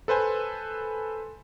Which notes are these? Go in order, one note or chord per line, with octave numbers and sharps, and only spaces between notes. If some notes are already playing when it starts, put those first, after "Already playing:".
A4 B4 C5 G#5